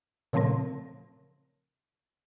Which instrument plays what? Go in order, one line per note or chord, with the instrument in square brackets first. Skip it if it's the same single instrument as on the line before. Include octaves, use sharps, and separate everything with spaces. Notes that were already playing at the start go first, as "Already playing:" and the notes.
[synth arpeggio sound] A#2 C#3 F3 A3 C4 A#4